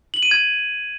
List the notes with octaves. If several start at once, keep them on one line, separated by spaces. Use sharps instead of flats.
F#7
D#7
G#6